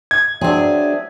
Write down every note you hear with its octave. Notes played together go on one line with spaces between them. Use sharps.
G#6
F#3 C4 D4 G#4 E5